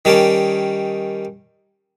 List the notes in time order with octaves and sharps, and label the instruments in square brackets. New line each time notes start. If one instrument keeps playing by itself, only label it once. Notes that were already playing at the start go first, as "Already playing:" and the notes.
[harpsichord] D#3 G3 C#4 A5